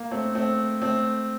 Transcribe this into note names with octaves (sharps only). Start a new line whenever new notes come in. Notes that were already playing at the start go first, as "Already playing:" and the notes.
Already playing: A#3
A3 C4
A3 C4
A3 C4